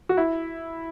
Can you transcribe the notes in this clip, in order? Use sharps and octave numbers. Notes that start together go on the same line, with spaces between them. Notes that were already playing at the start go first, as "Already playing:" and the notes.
F#4
E4